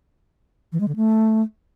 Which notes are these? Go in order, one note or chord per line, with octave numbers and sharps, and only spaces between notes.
E3
G#3
D3
A3